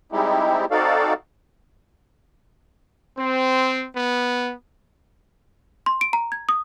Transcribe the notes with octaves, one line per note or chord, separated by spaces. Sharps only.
G3 G#3 C4 D#4 E4 G4
C4 D#4 F#4 A4 D5 F5
C4
B3
C6
D7
A#5
G#6
D#6